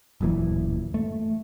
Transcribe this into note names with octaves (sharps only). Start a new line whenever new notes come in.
D1 F#2 A#2 E3
A3